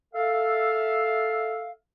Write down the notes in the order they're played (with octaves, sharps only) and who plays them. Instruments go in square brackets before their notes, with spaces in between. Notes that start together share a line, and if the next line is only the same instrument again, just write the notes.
[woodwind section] A4 E5 F5